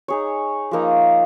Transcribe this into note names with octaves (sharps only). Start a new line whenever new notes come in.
D#4 G#4 C#5
F3 A#3 D#4 A#4